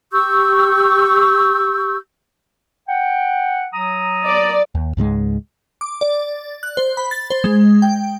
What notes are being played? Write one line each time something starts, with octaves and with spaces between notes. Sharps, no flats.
G4 C#6 E6 G6
F#5 G5
F#3 A#5 D#6
D5
D#2
C#2 G#2 G3 G#3
D6
D5
F#6
C5
B5
A6
C5
G#3
G5